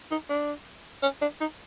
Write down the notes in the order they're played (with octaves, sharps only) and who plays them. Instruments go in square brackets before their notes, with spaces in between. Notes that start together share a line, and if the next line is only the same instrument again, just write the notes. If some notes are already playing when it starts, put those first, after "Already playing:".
[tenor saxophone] D#4
D4
C#4
D4
D#4